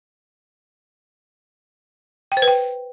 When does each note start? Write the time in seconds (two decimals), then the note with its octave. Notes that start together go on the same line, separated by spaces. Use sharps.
2.32 G5
2.37 C5
2.42 B4
2.48 G5